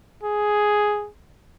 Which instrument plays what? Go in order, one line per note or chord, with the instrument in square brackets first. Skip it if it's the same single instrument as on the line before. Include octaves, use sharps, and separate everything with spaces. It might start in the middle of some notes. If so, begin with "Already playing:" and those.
[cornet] G#4